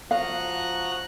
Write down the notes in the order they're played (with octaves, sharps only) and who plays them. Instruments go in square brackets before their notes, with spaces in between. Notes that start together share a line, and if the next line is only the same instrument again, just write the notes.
[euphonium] F3 [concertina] F#4 C#6 D#6 [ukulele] F5 [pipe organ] A#5 F#6